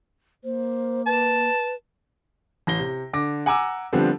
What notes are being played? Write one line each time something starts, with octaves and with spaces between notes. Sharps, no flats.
A#3 C5
B4 A5
A1 A#6 G7
C3
D3 D6 A#6
F#5 G#5 A#5 D6 E6
D3 F3 G3 B3 C4